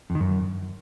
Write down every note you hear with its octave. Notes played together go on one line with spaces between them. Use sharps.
F2
D#3
F#2